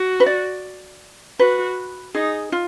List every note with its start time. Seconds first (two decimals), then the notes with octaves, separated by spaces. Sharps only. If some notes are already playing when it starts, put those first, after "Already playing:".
Already playing: F#4
0.20 B4
0.26 D5
1.39 F#4 B4
2.15 D#4 G#4
2.52 F4